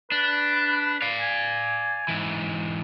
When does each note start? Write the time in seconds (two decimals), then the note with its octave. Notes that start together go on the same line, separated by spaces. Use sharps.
0.12 D4 B4
1.02 D5 F5
1.21 G#5
2.08 G#2 E3